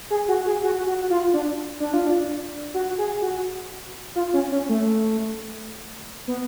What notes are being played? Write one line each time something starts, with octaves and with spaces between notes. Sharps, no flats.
G#4
F#4
G#4
F#4
F#4
F4
D4
D4
F4
D4
F#4
G#4
F#4
F4
C#4
C#4
A3
B3